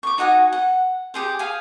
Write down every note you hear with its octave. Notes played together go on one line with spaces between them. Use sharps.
C#6 D6
D#4 F#4 F#5 G#5
F#5
G4 G#4 C5
G#4 F5 G#5